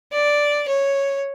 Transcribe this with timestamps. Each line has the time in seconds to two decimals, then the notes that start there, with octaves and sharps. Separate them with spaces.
0.12 D5
0.69 C#5